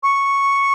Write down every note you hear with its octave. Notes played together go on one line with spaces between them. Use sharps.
C#6